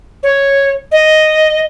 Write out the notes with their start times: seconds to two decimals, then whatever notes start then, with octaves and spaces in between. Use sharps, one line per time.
0.23 C#5
0.92 D#5